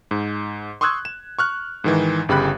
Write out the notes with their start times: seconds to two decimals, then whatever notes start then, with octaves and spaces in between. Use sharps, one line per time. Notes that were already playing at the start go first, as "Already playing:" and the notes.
0.11 G#2
0.81 C6 C#6 D#6 E6 F#6 G#6
1.05 E7
1.39 C#6 F6 F#6
1.84 G#2 D#3 E3
2.29 G1 C#3 G4 B5 F#6